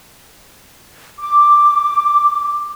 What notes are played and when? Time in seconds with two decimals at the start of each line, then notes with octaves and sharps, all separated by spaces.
1.20 D6